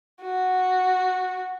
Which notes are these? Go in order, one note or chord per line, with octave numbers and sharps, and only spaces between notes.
F#4